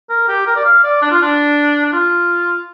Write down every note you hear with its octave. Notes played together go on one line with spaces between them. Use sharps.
A#4
G4
A#4
D5
F5
D5
D4
F4
D4
D4
F4